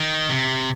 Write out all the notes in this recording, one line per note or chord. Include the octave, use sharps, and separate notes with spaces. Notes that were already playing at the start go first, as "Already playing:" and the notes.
Already playing: D#3
C3